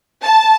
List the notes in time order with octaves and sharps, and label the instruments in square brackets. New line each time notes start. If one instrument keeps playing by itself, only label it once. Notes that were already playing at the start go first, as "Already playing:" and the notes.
[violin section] A5